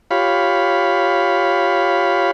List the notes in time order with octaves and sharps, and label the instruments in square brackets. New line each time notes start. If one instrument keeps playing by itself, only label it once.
[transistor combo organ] F4 G4 C#5 F5 B5